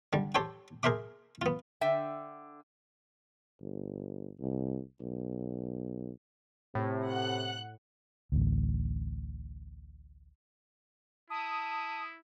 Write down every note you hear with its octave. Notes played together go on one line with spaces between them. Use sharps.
D3 G3
G4 A4 C5 C#5 G5
G#4 A#4 C5 E5 D6
B3 F4
D3 E5 G5
G1
C2
B1
A2 C3
F#5 F#6
A1 D2
E4 A5 D#6